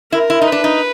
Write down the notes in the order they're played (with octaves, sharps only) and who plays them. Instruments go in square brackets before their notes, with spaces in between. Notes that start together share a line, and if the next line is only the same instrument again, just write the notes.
[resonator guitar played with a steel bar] E4 [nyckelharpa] A#4
[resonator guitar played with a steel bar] E4
D#4
[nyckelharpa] B4
[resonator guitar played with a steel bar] D4
D#4